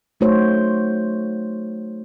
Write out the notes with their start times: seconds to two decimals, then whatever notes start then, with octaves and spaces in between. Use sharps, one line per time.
0.20 F#3 A3 D#4 F#4 C5 C#5